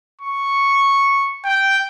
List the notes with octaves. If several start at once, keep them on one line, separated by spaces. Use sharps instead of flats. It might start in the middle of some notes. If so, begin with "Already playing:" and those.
C#6
G5